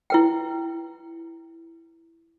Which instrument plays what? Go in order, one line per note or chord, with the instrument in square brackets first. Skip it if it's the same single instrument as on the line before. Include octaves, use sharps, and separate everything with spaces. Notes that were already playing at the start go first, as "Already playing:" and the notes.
[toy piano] E4 B4 G5